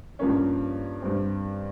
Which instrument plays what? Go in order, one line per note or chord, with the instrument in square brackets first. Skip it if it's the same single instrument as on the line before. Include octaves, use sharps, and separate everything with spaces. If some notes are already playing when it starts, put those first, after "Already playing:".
[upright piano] G2 F3 A#3 C#4
G2 G3 C4